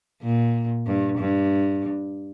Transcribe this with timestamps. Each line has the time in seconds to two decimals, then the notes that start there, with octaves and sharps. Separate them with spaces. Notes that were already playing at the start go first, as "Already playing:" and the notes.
0.22 A#2
0.86 G2
1.18 G2